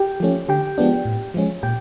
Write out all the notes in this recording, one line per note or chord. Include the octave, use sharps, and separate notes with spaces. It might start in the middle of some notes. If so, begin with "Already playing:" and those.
Already playing: G4 G5
F3 A3 C#4
D3 G4 G5
F3 G#3 B3 D4
A2
F3 G#3 C#4
A#2 G4 G5